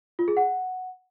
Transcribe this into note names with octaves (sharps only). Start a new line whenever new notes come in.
F4
G#4
F#5